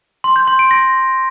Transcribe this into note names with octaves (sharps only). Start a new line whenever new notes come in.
C6
G6
C6
D7
A#6